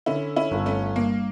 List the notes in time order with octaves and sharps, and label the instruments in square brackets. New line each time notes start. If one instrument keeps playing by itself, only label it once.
[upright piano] D3 [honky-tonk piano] C#4 E4
[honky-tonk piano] C#4 E4
[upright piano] G1
[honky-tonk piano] A3 C#4
[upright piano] G2 [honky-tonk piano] A#3